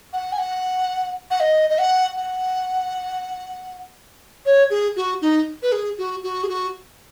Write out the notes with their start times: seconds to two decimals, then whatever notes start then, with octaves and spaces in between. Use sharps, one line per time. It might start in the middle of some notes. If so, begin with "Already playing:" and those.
0.13 F#5
0.33 G#5
0.38 F#5
1.31 F#5
1.40 D#5
1.70 D#5
1.79 F#5
2.16 F#5
4.46 C#5
4.70 G#4
4.96 F#4
5.22 D#4
5.62 B4
5.72 G#4
5.98 F#4
6.23 F#4
6.44 G#4
6.49 F#4